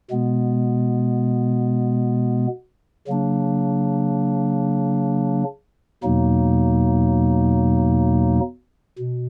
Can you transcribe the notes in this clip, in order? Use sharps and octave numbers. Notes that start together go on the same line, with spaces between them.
B2 G#3 B3
C#3 F#3 A#3 D4
E2 B2 F#3 A#3 D#4
B2